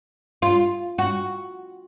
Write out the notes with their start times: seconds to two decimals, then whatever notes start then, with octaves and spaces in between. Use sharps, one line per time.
0.42 F4
0.98 F#4